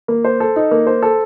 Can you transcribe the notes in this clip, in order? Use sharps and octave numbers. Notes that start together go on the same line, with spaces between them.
A#3
C5
A4
D#4
A#3
C5
A4